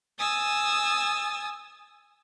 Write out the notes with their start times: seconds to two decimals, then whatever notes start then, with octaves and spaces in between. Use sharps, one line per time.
0.18 G#5 D#6 E6 A6